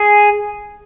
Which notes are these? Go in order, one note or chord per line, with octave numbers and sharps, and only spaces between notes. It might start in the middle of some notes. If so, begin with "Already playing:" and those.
Already playing: G#4